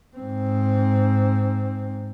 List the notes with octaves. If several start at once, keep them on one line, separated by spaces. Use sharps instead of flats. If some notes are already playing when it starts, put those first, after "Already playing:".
G#2 C4